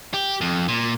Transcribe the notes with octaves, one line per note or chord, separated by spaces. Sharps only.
G4
F2
A#2